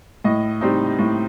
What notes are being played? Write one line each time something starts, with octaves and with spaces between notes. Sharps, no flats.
A2 D#5
G3 C4 D#4
A2